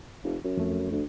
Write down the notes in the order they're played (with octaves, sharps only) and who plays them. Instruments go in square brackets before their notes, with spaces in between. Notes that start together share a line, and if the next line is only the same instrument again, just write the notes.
[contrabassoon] F1
F#2
[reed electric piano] F2 A3
[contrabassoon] D2